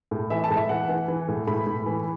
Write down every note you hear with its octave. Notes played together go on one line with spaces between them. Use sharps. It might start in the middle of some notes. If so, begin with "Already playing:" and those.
A2
E3 E5
A5
A2
E5
E3 F#5
E3
E3
A2
A2 B5
A2
E3